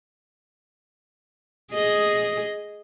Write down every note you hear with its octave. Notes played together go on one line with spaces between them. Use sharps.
G#4 D#5